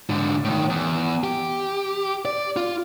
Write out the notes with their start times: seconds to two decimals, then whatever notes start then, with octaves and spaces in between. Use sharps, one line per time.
0.10 G#2 D3
0.44 A2 D#3
0.70 E2
1.24 G4
2.25 D5
2.56 F4